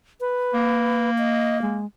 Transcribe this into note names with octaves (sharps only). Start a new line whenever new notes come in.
B4
A#3
D#5
G#3